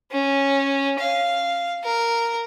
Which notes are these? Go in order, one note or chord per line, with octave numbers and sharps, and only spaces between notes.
C#4
F5
A#4